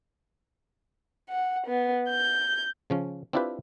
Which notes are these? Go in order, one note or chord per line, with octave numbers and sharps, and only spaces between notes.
F#5
B3
G6
C#3 F3 C#4
C4 D4 E4 F4 G4 B4